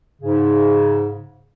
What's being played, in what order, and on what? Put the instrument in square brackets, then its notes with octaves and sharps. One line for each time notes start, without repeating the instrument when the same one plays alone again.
[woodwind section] G#2 C#3